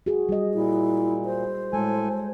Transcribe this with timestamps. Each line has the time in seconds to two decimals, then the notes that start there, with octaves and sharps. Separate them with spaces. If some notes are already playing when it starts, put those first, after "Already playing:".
0.06 F#4 G#4
0.29 G3 D#5
0.54 A#2 E4
1.25 C5
1.73 A2 G#3 A4 G#5